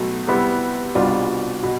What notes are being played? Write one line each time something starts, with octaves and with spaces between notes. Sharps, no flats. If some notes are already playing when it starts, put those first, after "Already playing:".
Already playing: B1 B2 A3
C3 G3 B3 E4
C2 B2 G3 D4 F4
B2